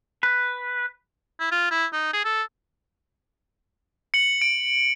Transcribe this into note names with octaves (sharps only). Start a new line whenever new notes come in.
B4
E4
F4
E4
D#4
G#4
A4
C#7 F#7
D7